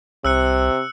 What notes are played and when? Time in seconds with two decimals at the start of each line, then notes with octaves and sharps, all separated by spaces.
0.25 C2 C3 E6 F#6 C#7